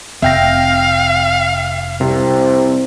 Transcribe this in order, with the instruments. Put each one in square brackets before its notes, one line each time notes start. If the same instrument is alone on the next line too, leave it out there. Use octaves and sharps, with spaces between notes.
[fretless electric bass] F1 C4 [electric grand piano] E5 G5 A#6 [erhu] F5
[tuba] C2 [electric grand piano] C3